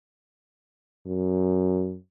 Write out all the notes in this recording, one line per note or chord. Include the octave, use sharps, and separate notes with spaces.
F#2